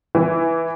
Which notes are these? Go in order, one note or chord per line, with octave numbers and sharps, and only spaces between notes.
E3